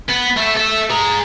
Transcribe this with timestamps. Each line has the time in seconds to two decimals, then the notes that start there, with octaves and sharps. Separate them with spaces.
0.09 B3
0.37 A3 A4
0.56 A4 E5
0.90 G#4 A#5